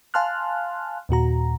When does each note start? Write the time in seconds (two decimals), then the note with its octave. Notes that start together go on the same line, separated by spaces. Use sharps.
0.14 F5 G#5 A5 C6 F6 F#6
1.09 D#2 A#2 F#4 A#5